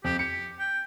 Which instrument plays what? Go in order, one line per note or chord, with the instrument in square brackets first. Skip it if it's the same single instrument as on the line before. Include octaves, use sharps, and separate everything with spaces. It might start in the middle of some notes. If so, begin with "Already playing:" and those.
[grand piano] F2 [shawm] G4
[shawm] G4 [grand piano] C#7
[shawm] G5